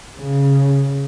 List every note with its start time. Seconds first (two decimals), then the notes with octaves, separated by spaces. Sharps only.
0.20 C#3